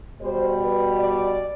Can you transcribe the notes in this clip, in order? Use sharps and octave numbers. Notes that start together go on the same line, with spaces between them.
B2 G3 C5
B4
D5